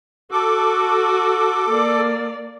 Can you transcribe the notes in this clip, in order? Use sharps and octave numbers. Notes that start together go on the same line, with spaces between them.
F#4 A4 D6
A#3 D5